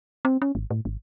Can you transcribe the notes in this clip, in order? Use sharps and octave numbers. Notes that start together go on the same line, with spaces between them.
C4
C#4
G#1
A2
G#1